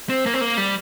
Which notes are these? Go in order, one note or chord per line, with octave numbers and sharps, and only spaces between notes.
C4
A#3
C4
A#3
G3